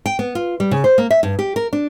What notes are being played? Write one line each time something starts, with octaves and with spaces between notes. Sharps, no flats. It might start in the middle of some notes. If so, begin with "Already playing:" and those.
G5
B3
F4
G3
C#3
C5
A#3
E5
G2
G4
A#4
D4